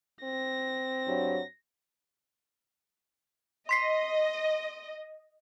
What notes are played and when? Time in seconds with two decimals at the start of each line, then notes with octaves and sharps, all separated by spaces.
0.23 C4 A#6
1.06 G2 F#3
3.69 D#5 C6 B6 C7